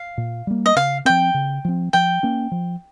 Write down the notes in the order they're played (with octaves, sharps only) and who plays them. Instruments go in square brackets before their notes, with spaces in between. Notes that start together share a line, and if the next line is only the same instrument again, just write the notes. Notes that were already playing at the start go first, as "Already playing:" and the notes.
Already playing: [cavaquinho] F5
[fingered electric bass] A#2
G3 A#3
[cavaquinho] D#5
[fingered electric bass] C#3 [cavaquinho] F5
[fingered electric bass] F3 C4 [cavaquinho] G5
[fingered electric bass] C#3
F3 C4
[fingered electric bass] F3 [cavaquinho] G5
[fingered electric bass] A#3 C#4
F3